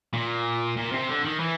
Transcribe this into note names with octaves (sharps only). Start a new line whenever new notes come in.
A#2
A#2
C3
D3
D#3
E3